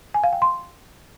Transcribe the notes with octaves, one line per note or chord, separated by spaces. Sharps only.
G#5
F5
G5
C6